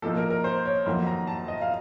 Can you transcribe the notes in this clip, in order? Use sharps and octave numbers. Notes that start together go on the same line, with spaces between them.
A#2 F3 A#3 D#4 A4
A#4
A#4
C5
C#5
F2 D#3 F#3 A#3 C6
A#5
A5
D#5
F5